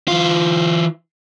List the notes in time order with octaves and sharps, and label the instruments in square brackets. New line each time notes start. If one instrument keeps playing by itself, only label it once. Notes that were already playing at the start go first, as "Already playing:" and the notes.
[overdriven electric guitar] E3 F4